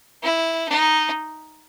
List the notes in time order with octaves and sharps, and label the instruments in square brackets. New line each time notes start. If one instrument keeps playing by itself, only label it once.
[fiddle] E4
D#4